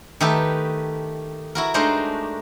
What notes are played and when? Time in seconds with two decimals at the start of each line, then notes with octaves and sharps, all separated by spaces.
0.20 D#3 A3 D#4 G4 A4 B4
1.55 E4 F#4 A#4
1.74 G#3 A3 D4 D#4 A#4 C5